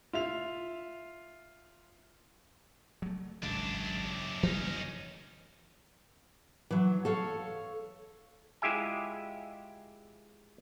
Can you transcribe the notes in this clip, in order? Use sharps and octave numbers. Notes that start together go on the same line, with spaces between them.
F4 E5 F7
F#3 A3
G#1 C#2 F#2 C#3 D4
E3 G3 A#3 C#4 D#4
E3 F#3
A4 C#5 F5
G#3 E4 F4 G4 E5 G#5